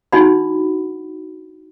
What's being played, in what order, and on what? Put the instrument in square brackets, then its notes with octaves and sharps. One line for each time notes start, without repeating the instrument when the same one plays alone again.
[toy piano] D4 D#4 F#4 F#5 B5